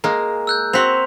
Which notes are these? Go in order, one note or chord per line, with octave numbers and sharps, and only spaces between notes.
G#3 A#3 A#5
E6 F#6 G6
C4 F#4 C6 B6 F7